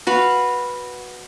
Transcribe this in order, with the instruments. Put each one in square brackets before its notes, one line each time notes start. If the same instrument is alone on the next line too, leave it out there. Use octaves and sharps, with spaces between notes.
[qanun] F#4 B4 F5